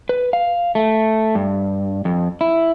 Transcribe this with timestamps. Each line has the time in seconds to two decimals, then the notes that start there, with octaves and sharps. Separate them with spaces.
0.09 B4
0.33 F5
0.75 A3
1.35 G2
2.05 F2
2.41 E4